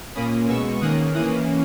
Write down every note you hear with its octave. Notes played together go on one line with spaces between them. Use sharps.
A#2 A#3 C#4 B5 D#6
B2 G#3 B3 C#6 E6
D#3 A#3 C#4 D#6 F#6
E3 A#3 C#4 D#6 F#6